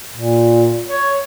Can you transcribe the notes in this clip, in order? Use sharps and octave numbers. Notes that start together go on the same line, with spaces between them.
A#2
C#5